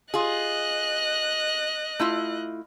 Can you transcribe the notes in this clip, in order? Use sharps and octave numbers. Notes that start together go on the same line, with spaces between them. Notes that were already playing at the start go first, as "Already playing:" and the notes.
F4 G#4 D#5 F#6
A3 E4 F4